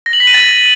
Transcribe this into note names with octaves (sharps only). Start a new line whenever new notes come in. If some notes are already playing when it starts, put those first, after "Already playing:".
A#6
F#7
B6
D#7
A6